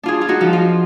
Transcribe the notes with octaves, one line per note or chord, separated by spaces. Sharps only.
D4 F4 G#4
F4
D#4 F#4
F3
F4